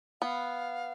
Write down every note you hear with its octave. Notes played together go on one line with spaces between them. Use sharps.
B3 F5